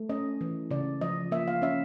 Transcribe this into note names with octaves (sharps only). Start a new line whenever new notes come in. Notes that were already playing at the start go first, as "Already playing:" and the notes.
Already playing: A3
C#4 D#5
E3
C#3 D5
F3 D#5
A#3 E5
F5
C#4 E5